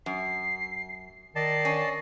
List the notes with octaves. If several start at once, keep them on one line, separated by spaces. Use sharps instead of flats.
F#2 C7
D#3 D5 D#5 A5 C7
C#4